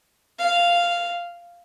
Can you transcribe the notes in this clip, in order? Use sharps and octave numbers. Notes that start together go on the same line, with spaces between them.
F5